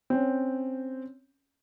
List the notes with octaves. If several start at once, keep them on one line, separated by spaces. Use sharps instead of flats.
C4 C#4